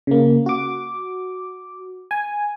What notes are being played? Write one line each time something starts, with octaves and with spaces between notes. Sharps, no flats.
C#3 A#3
F#4 D6
G#5